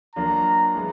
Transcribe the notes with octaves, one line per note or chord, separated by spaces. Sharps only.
F#3 A#3 D4 F4 A#5
E3 G#3 B3